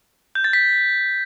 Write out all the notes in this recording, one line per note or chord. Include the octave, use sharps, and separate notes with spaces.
G6
A6
B6